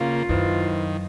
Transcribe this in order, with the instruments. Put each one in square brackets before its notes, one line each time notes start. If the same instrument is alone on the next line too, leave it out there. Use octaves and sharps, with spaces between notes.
[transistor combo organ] C#3 A#3 [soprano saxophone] F4
[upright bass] F#2 [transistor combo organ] D#3 [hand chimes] E4 B4 C5